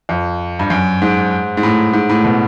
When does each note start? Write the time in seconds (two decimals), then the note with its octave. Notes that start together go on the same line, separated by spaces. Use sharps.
0.09 F2
0.59 G2
0.70 F#2
1.02 G#2
1.57 G#2
1.63 A2
1.93 G#2
2.09 A2
2.25 B2